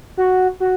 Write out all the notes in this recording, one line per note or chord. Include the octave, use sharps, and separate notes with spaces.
F#4
F#4